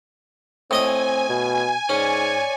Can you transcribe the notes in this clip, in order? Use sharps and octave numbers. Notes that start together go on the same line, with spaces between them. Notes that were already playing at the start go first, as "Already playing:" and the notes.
A2 C4 D#5 G#5 D#6
B2
G#2 C#4 C#5 D5